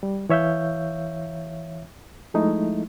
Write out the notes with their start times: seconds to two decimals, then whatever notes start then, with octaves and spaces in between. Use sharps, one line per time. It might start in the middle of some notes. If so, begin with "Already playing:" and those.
0.03 G3
0.29 E3 C#5 E5 F5 G6
2.34 F3 G#3 A3 D#4 E4